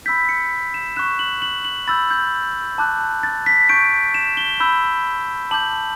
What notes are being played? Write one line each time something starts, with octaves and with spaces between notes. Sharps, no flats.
B5 E6 G6 B6
C#7
E7
C#6 F#6 E7
F#7
F#7
F#7
B5 E6 G6 A6
G6
A5 D6 F#6
A6
B6
C#6 G6 D7
E7
G7
B5 E6 G6
A5 D6 G6 F#7